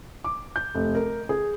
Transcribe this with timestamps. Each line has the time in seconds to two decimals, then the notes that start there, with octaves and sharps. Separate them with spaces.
0.24 D6
0.56 G6
0.75 F1
0.95 A#4
1.29 G#4